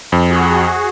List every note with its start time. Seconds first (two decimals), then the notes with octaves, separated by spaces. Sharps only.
0.12 F2
0.30 F#4 G#4